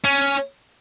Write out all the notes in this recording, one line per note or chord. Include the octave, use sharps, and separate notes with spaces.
C#4